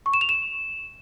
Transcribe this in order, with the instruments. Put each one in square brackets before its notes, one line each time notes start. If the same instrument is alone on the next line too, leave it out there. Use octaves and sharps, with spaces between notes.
[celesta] C#6
E7
F7
E7